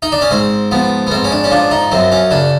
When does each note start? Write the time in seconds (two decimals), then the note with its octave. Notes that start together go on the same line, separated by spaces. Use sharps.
0.02 D#4
0.12 D4
0.21 C#4
0.31 G#2 C4
0.72 F3 B3
1.07 B3
1.11 G#2 C4
1.24 C#4
1.32 D4
1.44 C#4
1.51 F3 D4
1.71 D#4
1.91 F#2 C4
2.12 C#4
2.31 C#3 D4